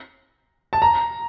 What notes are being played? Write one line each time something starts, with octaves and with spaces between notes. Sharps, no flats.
A5
A#5